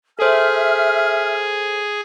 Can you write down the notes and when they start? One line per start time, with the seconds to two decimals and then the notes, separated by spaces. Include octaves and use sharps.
0.19 G#4 A4 C5 E5 F6